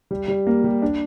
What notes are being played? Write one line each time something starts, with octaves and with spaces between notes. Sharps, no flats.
G3
G3
A#3
G3
D4